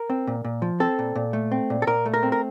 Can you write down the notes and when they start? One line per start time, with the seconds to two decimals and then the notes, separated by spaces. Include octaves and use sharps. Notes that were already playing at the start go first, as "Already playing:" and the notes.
Already playing: A#4
0.10 C4
0.27 A#2
0.44 A#2
0.62 F3
0.80 C4 A4
0.99 A#2
1.15 A#2
1.33 A3
1.52 C4
1.70 A#2
1.82 A4
1.87 A#2 A#4
2.06 A3
2.14 A#4
2.23 C4
2.32 A#4